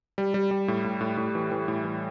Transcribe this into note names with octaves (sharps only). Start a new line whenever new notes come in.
G3
G3
G3
A2
A2
A2
A2
E3
E3
A2
E3